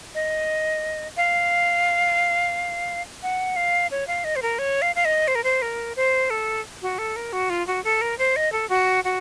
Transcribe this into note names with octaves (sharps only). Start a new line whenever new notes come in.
D#5
F5
F#5
F5
C#5
F5
D#5
C5
A#4
C#5
F5
F5
D#5
C5
A#4
C5
A#4
C5
A4
F#4
A4
A#4
F#4
F4
F#4
A4
A#4
C5
D#5
A4
F#4
F#4